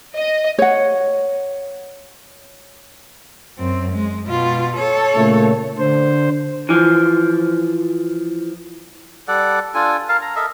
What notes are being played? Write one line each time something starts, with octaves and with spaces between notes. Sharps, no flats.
D#5
C#5 F#5
F#2 C4
G#3
B2 F4
A4 C#5
A#2 C#3 A3
D3 C5
E3 F3
G3 A4 D5 F#5
D4 F4 A4 G#5
A#4 F5 A5
A#5
A4 A#4 D#5 E5